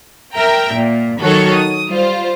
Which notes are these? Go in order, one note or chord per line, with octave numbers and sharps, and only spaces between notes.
A#4 E5 G5 A#5
A#2
D#3 F#3 F#4 A4 C#5 C#6
D#6
G3 F4 C5